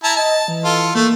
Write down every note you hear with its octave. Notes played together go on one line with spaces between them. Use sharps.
E4 A5 A#5
D#5 A5
E3
F4 A4
A3 A#3